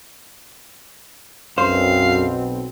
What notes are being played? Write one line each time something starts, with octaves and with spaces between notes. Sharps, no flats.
B1 F#2 B2 C4 C5 F5